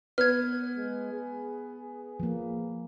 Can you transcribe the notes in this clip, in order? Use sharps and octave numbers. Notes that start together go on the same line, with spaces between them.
B3 F6 G#6
G#3
G#4
F3 A#3